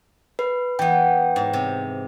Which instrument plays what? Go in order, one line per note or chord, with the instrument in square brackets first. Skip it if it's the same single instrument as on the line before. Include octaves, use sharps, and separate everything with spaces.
[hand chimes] B4
[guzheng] E3 B3 [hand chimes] G5
[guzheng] G#2
C3